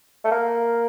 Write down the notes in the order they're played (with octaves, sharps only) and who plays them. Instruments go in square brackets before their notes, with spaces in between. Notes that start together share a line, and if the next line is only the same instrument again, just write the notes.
[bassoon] A3
A#3